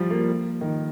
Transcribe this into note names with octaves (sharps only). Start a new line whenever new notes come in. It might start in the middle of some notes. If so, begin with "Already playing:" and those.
Already playing: F3 G3
A#3
D#3